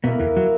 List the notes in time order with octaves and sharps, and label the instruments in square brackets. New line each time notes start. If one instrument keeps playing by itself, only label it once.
[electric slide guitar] B2 B3 [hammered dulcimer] A#3 E4 A#4
[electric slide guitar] E2 E3
F#3